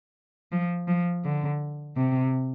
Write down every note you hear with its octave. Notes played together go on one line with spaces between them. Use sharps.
F3
F3
D3
C3